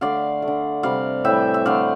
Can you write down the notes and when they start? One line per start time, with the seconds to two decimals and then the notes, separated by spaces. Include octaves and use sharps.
0.01 D3 A3 D5 F5
0.42 A3
0.48 D3
0.83 C3 G3 D5 F5
1.25 A2 E3 G3 E5 G5
1.54 E5
1.66 D3 A3 D5 F5